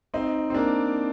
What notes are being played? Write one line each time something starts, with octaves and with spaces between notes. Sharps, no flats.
C4 D#4
C4
A#3 D4